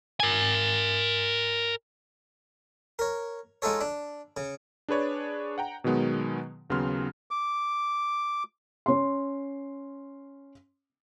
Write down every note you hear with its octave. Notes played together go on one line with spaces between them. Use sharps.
A#4 G#5
A#4 C#5
G#3 D#4 F4 A4 C#5
D4
C#3
D4 G#4 B4 C#5 D5
F#5 G5 A#5
B2 D#3 F#3 G#3 B3
D#2 C#3 F#3 B3 C6 F6
D6
C#4 C6